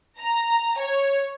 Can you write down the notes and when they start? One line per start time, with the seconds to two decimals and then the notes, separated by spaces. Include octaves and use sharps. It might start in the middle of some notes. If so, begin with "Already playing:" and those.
0.17 A#5
0.77 C#5